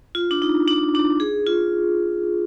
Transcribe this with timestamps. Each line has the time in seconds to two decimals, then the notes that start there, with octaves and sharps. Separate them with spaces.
0.15 F4
0.31 D4
0.42 D#4
0.68 D4
0.95 D4
1.20 G#4
1.46 F4